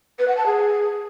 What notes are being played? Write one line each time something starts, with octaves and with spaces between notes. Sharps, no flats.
B4
F#5
A5
G#4